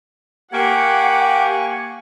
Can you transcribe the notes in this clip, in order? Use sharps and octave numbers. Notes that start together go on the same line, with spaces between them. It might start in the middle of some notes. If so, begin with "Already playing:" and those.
A#3 G4 F#5 G#5 C#6